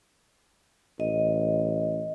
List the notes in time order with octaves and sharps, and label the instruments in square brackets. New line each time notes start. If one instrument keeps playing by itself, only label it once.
[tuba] A1 [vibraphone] D#5